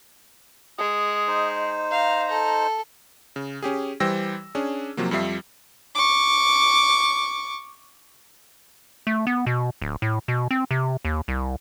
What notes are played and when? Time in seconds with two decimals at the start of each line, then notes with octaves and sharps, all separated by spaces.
0.78 G#3 D#6
1.28 D#4 C5
1.91 F5 A#5
2.30 A4
3.36 C#3
3.62 C#4 G4 G#4
4.00 E3 G3 C5 G5 E6 A#6
4.55 C#4 D4 G#4
4.97 C3 F3 F#3 A#3
5.11 F2 F3 G3 E5 C7
5.95 C#6 D6
9.07 A3
9.27 B3
9.46 B2
9.82 D1
10.02 A2
10.28 B2
10.51 C4
10.71 C3
11.05 D#2
11.28 C2